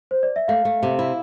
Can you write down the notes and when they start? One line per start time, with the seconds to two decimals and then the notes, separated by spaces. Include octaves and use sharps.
0.11 C5
0.23 D5
0.36 E5
0.48 A3 F5
0.65 A3
0.83 C3
0.99 E4